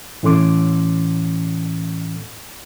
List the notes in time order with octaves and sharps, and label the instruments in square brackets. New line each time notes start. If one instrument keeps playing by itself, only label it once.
[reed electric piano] A2 E3 C#4 A4 C6 D6